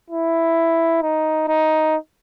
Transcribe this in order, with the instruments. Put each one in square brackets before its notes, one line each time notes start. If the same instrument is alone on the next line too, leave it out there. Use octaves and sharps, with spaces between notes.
[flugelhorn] E4
D#4
D#4